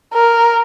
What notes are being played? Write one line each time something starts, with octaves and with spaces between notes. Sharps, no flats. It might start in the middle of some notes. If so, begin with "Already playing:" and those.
A#4